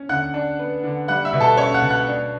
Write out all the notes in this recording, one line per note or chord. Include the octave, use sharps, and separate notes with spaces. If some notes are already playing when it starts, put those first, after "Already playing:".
Already playing: C#4
D3 F#5 F#6
D4
B3
D3
G3 F#5 F#6
E5 E6
B2
A4 A5
C#4 C#5 C#6
F#5 F#6
B2
F#5 F#6
D4